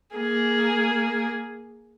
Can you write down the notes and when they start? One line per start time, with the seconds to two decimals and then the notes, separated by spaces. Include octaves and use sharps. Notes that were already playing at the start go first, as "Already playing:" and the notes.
0.16 A#3 G#4